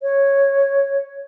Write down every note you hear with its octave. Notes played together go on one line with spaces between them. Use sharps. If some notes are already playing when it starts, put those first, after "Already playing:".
C#5